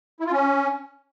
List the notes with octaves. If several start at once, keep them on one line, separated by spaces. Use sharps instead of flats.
E4
F4
C#4